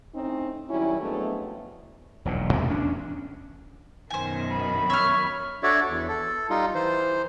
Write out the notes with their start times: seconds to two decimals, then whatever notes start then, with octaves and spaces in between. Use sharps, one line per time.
0.14 A2 C4 C#4 D#4
0.69 D#3 F#3 G3 C#4 E4
1.01 F2 F#3 G#3 A3 B3 D4
2.25 E1 B1 A#2
2.54 E2 C3 A3
2.70 E2 C#4 D4
4.10 F#2 B2 D#3 C5 G#5
4.51 B5
4.90 C#5 E5 F6
5.63 D4 F#4 A4 C#5 D5 E5
5.89 E2
6.08 A4
6.50 G3 D#4 F4
6.75 E3 C5